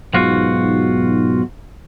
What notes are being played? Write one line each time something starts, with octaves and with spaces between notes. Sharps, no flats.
B1 G#2 F4 F#4